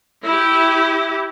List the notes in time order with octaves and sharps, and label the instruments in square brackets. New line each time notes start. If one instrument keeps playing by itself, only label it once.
[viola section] E4 G4